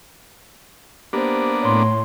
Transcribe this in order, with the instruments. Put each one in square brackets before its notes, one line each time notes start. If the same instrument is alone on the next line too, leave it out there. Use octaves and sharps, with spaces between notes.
[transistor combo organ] A#3 B3 D4 [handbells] G4 C5
[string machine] A2 [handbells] C#5 C6